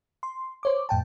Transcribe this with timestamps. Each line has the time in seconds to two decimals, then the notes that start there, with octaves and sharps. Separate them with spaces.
0.23 C6
0.63 C5 C#5 D6
0.89 F2 A2 G5 A5